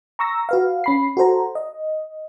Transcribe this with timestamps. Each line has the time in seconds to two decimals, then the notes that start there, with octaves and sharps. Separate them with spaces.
0.19 A#5 C#6 E6 A#6
0.49 F#4 B4 F5
0.84 C#4 B5 C7
1.17 F#4 A4 C5 A#5
1.55 D#5